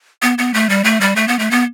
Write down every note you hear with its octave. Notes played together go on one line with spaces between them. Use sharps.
B3
B3
A3
G3
A3
G3
A3
B3
A3
B3